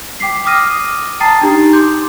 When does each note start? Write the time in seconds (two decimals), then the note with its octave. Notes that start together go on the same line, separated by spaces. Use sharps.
0.20 G5 D6 B6 C7
0.45 D6 D#6 F6 A#6 D#7
1.20 G5 A5 A#5 D#6 A6 C7
1.41 D4 D#4 G4 A#5
1.73 C6 D6 G6